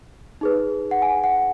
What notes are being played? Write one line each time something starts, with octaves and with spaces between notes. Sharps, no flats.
D#4 G#4 B4
F#5
G#5
F#5